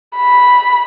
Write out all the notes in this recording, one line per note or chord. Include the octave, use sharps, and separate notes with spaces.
B5